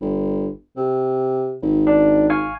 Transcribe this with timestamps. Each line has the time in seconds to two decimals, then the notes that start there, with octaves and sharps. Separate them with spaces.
0.01 G1
0.76 C3
1.62 G#1
1.87 D4
2.30 F5 G#5 C#6